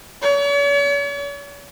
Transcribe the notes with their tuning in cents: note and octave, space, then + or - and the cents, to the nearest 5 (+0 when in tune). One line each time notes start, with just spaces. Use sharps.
C#5 +45